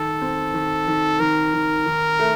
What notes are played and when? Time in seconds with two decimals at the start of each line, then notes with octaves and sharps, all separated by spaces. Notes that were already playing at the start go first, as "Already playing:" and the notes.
Already playing: D#3 A4
0.22 C4
0.54 D#3
0.88 D#3
1.20 D#3 A#4
1.54 D#3
1.86 D#3
2.19 A3